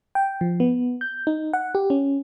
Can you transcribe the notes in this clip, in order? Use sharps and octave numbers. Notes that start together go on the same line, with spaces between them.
G5
F3
B3
G6
D#4
F#5
G4
C#4